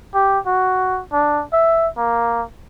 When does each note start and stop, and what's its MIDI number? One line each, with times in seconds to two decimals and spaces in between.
0.15 0.39 67
0.46 1.01 66
1.13 1.43 62
1.53 1.88 76
1.97 2.43 58